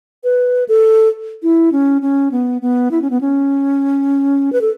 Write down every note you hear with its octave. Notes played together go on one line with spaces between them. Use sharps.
B4
A4
E4
C#4
C#4
B3
B3
E4
C#4
B3
C#4
B4
A4